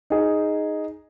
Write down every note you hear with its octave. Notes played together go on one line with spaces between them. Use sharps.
D#4 G#4